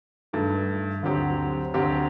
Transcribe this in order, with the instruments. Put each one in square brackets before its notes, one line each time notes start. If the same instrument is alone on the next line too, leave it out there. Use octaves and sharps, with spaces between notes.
[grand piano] G2 D#3 A3
D2 D3 F#3 C4 G4
D2 D3 F#3 C4 G4